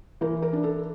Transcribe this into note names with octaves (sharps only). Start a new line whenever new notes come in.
E3 A#4
A#4
D4
A4